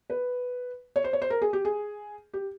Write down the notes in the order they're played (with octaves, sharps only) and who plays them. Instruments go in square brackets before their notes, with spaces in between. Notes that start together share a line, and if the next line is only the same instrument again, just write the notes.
[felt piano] B4
C#5
C5
C#5
C5
A#4
G#4
G4
G#4
G4